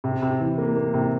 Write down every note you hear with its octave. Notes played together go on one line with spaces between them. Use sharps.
C3
C3
E3
A#3
A#3
C3